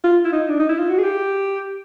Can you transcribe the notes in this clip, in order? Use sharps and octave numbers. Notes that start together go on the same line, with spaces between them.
F4
E4
D#4
D4
D#4
E4
F4
F#4
G#4
G4